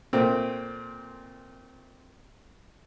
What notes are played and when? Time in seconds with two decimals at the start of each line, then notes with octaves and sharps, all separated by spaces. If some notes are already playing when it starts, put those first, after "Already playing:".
0.13 A#2 A3 C4